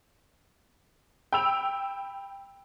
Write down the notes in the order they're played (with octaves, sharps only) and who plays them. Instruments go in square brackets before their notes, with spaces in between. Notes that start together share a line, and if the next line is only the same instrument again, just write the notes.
[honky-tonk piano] G5 B5 E6 F7